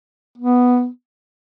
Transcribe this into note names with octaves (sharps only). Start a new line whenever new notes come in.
B3